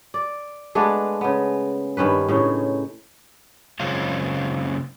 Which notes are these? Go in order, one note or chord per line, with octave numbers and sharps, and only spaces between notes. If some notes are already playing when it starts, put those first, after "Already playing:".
D5
G#3 A3 B3 D4
C#3 B3
G2 D#3 C#4 B4
A2 C#3 C#4 D#4
F#2 C#3 G#3 C4 C#4 F4